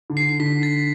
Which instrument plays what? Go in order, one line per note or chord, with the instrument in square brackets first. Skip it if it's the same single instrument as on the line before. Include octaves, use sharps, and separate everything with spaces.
[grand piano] D3
[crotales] C7
C7
[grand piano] D3 [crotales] B6
[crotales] A6